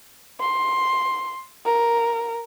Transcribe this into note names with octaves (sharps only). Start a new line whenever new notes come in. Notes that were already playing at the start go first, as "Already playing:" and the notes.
C6
A#4